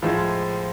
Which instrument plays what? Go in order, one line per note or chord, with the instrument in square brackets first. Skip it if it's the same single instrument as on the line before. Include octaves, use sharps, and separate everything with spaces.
[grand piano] A2 F3 G#3